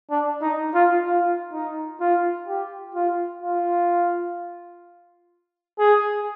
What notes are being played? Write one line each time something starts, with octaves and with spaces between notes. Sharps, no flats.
D4
D#4
F4
F4
D#4
F4
G4
F4
F4
G#4